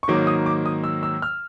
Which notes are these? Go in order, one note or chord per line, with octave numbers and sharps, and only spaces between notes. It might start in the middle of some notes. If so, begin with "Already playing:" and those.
C#6
G#2 D#3 F#3 A#3 D6
D#6
D6
D#6
E6
E6
F6